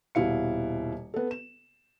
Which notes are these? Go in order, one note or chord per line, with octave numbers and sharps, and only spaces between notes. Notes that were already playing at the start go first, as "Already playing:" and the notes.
D#1 B2 E4 F5 C#7
B3 A4
E7